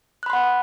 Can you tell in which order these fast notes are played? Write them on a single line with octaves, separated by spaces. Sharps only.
F#6 B5 C6 F#5